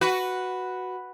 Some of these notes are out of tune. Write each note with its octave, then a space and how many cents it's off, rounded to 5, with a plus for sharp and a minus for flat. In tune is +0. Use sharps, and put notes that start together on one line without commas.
F#4 +0 B4 +0